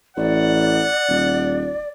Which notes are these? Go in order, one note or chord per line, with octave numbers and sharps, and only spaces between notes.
A1 D5 F#5
D#1